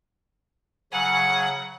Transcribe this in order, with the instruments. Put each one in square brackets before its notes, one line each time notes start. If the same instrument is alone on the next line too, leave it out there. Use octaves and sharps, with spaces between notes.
[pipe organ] C#3 F#3 G#5 [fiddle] F#5